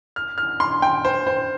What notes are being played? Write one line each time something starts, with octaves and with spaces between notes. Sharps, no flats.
F6
F6
C6
G5
C5
C5